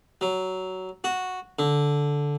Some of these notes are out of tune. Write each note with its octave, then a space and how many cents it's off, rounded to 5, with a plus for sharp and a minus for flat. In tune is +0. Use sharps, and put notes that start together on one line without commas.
F#3 +15
F#4 -5
D3 -10